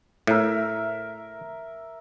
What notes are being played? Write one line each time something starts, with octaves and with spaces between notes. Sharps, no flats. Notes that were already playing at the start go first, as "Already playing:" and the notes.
A2 A#4 E5